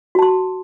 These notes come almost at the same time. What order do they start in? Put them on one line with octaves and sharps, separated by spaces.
F#4 A5 C6